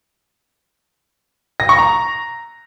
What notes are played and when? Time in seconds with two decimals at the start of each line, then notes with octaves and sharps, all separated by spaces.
1.60 A#6
1.69 C#6
1.79 A#5